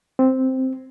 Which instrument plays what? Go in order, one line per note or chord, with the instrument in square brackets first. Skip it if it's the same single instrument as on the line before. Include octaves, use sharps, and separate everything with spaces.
[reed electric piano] C4